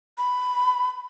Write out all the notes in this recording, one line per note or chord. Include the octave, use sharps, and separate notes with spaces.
B5